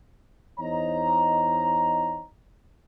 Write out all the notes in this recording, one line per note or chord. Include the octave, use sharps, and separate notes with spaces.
E2 D#4 C5 C#5 D#5 A#5